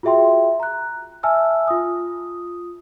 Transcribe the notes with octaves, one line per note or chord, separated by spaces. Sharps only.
F4 F#4 G#4 E5 G5 C6
A#5 F#6
E5 G#5 A5 E6 F6
F4 D#6